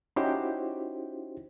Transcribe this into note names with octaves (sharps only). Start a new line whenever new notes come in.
C#4 D#4 E4 F#4 G4 C5